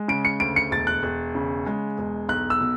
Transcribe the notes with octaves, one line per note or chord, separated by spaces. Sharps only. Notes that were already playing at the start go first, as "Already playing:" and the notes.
Already playing: G#3
C#3 D7
C#7
D2 D7
C#7
E1 A6
F#6
E1
C#3
G#3
E1
B1 F#6
E6
B2